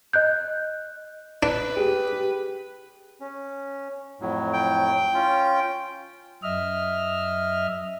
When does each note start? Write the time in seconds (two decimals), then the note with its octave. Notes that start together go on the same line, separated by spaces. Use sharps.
0.13 D#5 F#6 G6
1.43 D4 B4
1.77 G4 G#4
3.20 C#4
4.20 F2 A2 F#3
4.53 G5
5.14 C#4 F4
6.43 F#2 D#5 E5 F6